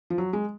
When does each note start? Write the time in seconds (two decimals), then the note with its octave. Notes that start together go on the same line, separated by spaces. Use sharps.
0.10 F3
0.18 F#3
0.33 G#3